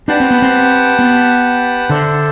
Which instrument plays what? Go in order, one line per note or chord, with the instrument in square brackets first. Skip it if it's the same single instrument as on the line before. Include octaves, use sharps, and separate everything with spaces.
[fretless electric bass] D4 [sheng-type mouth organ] G4 B4 F#5 A5
[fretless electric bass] C4
B3
C4
B3
[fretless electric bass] D3 [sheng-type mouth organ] D4 A4 C5 E5 A5